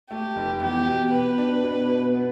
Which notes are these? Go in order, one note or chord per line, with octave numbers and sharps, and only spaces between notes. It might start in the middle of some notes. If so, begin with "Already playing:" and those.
A3 G4
F1
E2 G4
B2
B2 B4
D4
B2
B2
B3